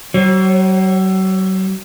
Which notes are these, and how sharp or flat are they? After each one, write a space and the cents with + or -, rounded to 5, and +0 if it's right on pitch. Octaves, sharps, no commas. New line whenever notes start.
F#3 +40 C#5 -40